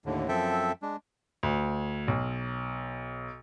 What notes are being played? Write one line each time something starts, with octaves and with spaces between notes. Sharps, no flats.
D#2 A2 D3
F#2 F3 C4 A4 E5 G5
G#3 D4
D2
B1